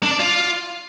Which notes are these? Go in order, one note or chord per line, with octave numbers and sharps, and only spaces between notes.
D4
D5
F4